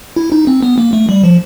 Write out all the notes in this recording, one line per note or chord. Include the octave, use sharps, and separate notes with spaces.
E4
D#4
C4
B3
A#3
A3
G3
F3